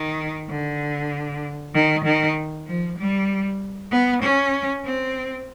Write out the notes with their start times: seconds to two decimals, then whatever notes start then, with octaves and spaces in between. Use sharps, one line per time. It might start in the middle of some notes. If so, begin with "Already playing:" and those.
Already playing: D#3
0.49 D3
1.74 D#3
2.05 D#3
2.67 F3
2.98 G3
3.91 B3
4.22 C#4
4.85 C4